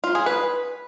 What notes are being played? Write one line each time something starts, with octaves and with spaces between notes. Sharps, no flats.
F4
G#4
B4